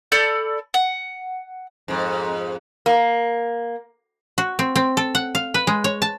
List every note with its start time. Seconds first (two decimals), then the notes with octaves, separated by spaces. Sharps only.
0.12 A4 D5 B5 G6
0.74 F#5
1.88 F2 G#2
2.86 A#3
4.38 F#4
4.59 C4
4.76 C4
4.97 A4
5.15 F#5
5.35 F5
5.54 B4
5.67 G#3
5.84 C#5
6.02 A5